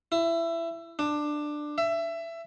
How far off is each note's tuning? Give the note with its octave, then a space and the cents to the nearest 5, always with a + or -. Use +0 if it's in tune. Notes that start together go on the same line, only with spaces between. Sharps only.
E4 +20
D4 +15
E5 +20